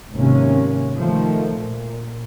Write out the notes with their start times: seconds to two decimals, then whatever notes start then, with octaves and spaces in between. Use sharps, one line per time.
0.14 G#1 C3 A#3 C#4
0.98 D#3 F3 A3
1.55 A#2